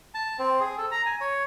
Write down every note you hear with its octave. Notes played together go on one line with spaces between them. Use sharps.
A5
C4
G#4
A4
A#5
G#5
C#5